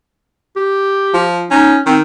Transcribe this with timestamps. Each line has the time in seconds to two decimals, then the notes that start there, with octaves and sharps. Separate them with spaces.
0.56 G4
1.14 F3
1.51 C#4 D#4
1.86 D#3 C4